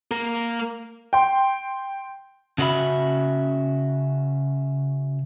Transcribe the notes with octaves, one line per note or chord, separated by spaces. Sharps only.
A#3 A#4
G5 C6
C#3 C#4 F#4 A#4 E5 B5